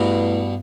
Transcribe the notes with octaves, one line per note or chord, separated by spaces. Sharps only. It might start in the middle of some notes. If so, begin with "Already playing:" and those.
Already playing: G2 B2 A3 E4 B4